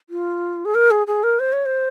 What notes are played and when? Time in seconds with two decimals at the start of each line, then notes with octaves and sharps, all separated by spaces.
0.10 F4
0.65 G#4
0.75 A#4
0.91 G#4
1.07 G#4
1.23 A#4
1.39 C5
1.53 C#5
1.66 C5